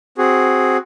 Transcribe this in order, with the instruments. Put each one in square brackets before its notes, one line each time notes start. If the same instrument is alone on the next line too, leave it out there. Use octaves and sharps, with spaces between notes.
[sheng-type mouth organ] C4 F#4 G#4